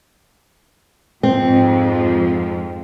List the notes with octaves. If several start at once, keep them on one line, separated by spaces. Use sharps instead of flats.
F2 G#2 F3 C4